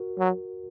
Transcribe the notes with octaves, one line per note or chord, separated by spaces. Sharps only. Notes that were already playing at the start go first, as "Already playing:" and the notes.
Already playing: F#4 A#4
F#3